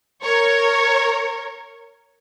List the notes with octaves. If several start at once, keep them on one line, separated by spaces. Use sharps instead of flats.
A#4 C#5